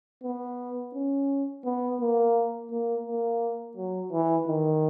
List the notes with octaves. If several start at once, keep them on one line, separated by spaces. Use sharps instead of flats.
B3
C#4
B3
A#3
A#3
A#3
F#3
E3
D#3